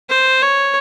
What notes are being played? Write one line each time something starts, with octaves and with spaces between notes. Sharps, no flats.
C5
C#5